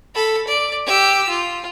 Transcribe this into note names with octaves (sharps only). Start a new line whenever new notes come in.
A4 B5
D5
G4 E6
F4